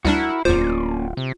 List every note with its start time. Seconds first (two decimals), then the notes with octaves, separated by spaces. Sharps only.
0.05 D2 G3 D4 E4 F#4 A#4 F#5
0.45 D1 E2 A#3 C#4 F4 C5 D5
1.17 C3